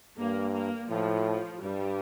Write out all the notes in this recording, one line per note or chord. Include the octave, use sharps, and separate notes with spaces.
G2 A#3
A#3
A2 F3
G2 G3